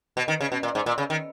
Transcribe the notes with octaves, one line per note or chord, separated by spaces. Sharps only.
B2
D#3
C#3
B2
A#2
G#2
A#2
C#3
D#3